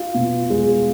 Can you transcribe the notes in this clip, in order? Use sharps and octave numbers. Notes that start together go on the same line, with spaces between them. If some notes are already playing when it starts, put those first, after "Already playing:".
Already playing: F4
B2
G#3